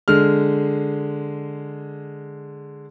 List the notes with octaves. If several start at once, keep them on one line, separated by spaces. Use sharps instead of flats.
D3 G#3 F6